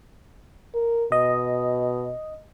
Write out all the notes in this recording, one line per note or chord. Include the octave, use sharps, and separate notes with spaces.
A#4
B2 D#5